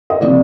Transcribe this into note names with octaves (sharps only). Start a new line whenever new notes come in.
D#5
C3 F3 A#3 D5